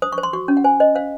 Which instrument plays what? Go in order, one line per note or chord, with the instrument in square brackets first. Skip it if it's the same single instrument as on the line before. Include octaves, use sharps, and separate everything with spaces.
[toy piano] C5 D#6
C#6
C5
C6
F#4 C#6
C#4
F#5
C5 G#5
C5 D#5
C5 F5